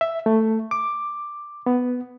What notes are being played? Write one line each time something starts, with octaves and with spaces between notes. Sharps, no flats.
E5
A3
D6
B3